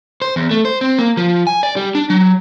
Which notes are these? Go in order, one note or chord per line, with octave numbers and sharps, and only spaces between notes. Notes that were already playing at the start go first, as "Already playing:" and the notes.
C5
E2
A3
C5
C4
A#3
F3
G#5
D5
G3
D4
F#3